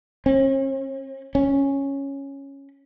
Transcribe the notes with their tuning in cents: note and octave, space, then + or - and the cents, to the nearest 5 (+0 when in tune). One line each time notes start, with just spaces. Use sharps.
C#4 -45
C#4 -5